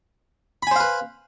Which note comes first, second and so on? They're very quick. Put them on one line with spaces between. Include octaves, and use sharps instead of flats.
B5 G#5 C5 F5 B4